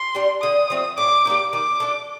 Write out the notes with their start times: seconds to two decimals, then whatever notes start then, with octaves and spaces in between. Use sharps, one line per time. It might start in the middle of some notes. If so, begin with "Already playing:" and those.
Already playing: C6
0.15 G3 D4
0.42 D3 D#6
0.70 F3 A3 C4
0.97 A2 D6
1.25 G3 A#3 D#4
1.53 D#3 D6
1.80 A3 D4